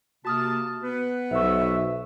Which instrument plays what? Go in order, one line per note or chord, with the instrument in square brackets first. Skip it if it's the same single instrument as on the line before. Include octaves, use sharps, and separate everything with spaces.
[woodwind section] C3 A#3 A5 [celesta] F#4 D#6 F6
[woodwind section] B3 B4
[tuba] B1 [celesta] C5 C#6 [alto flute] E5